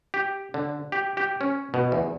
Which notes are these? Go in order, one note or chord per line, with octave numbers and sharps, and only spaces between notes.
G4
D3
G4
G4
C#4
B2
E2